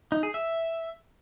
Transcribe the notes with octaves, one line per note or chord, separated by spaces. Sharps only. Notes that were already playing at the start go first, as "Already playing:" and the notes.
D#4
G#4
E5